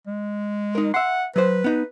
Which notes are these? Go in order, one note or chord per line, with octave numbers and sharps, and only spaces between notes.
G#3
D#4 A#4
E5 F#5 C6
F#3 B4 C5
B3 D#4